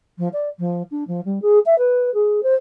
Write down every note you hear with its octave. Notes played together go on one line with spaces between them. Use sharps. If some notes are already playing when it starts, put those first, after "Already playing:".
F3
D5
F3
D4
F3
G3
G#4
E5
B4
G#4
C5